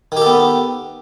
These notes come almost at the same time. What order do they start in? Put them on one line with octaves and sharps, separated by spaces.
D#3 G4 A4 B3